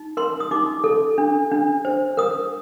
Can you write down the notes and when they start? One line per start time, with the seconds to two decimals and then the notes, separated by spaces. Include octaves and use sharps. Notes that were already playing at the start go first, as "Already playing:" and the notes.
Already playing: D#4
0.17 A#4 C6
0.40 D#6
0.51 D#4 D6
0.84 A4
1.18 D4
1.51 D4
1.85 C5
2.17 A#4 D#6